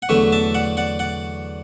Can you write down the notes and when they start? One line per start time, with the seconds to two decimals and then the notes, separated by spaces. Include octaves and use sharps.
0.02 F#5
0.09 E2 D3 F#3 A3 B4 E5
0.32 E5 A5
0.54 D5 F#5
0.77 D5 F#5
0.99 D5 F#5